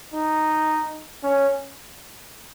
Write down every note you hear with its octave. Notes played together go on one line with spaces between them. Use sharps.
D#4
C#4